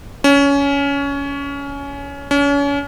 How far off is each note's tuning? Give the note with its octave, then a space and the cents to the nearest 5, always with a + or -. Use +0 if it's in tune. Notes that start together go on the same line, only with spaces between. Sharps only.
C#4 +20
C#4 +35